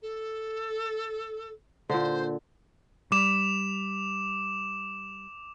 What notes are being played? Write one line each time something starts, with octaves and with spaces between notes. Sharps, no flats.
A4
A#2 D3 C5
G3 D6 E7